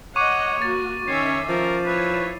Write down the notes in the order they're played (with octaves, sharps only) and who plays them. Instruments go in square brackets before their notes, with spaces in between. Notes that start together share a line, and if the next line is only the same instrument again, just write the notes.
[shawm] C#5 [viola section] D#5 F#5 [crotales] C#6 D6 D#7
[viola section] A#3 F#4 [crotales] A6
[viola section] D#3 C#4 E5 [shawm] C#5 [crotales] C7
[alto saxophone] F3 [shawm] A#4
[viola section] E4 C#5 [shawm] B4